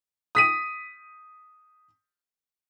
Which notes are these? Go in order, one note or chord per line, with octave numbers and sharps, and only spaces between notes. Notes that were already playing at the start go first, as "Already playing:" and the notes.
D#6 B6 D#7